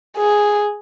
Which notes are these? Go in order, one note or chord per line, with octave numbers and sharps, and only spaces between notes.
G#4